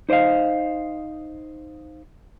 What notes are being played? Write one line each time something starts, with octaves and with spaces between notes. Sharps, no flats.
D#4 C5 D5 D#5 F5